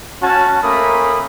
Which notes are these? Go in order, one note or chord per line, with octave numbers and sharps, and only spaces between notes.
C#4 F#4 A5
A3 A#3 C#4 A#4 B5 D#6